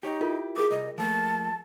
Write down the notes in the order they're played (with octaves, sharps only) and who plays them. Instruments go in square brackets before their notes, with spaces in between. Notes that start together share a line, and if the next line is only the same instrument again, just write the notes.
[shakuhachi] D#4 [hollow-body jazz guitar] G4 C#5
[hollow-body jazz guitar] E4 G4 [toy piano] F4 A4 A#4
[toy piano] G#4 A#4 D#6 [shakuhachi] D6
[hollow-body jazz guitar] C2 [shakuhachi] D#5
[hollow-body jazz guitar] F3 A3 A#3 [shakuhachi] A5